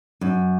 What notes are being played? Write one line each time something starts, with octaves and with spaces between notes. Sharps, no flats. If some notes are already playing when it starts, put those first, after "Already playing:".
F#2